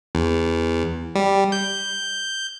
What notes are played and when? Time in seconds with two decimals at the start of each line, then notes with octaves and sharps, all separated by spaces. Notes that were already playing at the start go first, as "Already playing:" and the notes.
0.15 E2
1.15 G3
1.52 G6